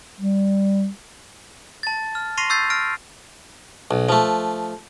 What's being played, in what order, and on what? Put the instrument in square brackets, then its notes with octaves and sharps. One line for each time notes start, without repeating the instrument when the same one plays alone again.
[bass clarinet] G3
[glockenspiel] A5 A6
F6
C6 C#6 A#6 C7 D#7 F7
C#6 E6 G6 A6 C7
F6 A#6 D7
[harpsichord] B1
F3 A3